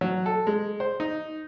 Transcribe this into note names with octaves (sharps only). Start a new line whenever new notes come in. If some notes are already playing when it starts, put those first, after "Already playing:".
F#3
A4
G#3
C5
D#4